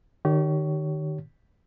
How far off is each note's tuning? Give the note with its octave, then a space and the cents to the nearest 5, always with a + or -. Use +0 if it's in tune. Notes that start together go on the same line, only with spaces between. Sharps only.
D#3 -25 G4 -30 C#5 +15